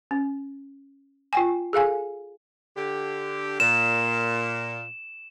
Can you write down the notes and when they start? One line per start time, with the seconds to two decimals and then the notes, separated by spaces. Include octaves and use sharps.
0.11 C#4
1.33 F4 G5 G#5
1.73 G#4 A4 F5 G#5
2.76 D3 G4
3.60 A#2 E7